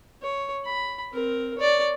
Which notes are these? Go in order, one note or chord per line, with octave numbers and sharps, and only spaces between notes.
C#5
B5
C4 A#4
C#5 D5